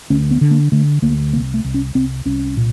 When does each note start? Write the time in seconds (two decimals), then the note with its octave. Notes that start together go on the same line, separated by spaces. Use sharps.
0.10 D2 C#4
0.31 B3
0.41 D3
0.51 A#3
0.72 D3 A3
1.02 D2 A#3
1.33 C2 A#3
1.54 A3
1.64 C2
1.74 C#4
1.95 C2 C4
2.25 C2 C#4
2.57 A#2